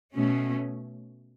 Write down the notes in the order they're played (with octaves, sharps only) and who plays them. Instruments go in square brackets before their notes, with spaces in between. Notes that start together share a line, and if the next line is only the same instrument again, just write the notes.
[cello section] B2 A3 C#4